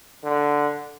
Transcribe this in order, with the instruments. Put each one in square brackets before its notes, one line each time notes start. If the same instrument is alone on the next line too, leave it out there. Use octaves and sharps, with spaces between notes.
[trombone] D3